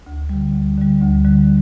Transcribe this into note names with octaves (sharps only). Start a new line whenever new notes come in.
D2
D3 G3
D2
D3 G3
D2
D3 G3